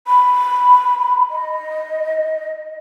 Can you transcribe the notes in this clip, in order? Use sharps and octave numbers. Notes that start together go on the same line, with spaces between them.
B5
D#5